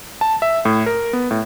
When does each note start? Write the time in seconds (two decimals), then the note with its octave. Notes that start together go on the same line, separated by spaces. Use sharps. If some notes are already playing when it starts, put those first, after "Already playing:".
0.21 A5
0.42 E5
0.65 A2
0.86 A#4
1.13 B3
1.31 A2